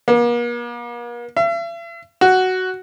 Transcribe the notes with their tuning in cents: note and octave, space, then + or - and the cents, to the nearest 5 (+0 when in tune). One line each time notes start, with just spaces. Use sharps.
A#3 +45
E5 +45
F#4 +5